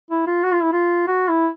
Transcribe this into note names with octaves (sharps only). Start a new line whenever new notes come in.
E4
F4
F#4
F4
E4
F4
F#4
E4